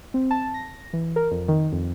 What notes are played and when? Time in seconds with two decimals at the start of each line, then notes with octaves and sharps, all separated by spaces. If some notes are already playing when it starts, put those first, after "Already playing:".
0.14 C4
0.31 A5
0.54 A#6
0.93 E3
1.16 A#4
1.31 F2
1.48 D#3
1.72 F2